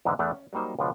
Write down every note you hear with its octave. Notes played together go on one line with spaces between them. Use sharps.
E2 G#2 D3 G#3
E2 A3 B3 D4 D5
C#4
F#3 G3 A#3 D#4 C5
C#2 B2 F3 D4